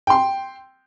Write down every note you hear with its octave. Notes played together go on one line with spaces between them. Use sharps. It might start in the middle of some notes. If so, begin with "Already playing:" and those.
G5 C6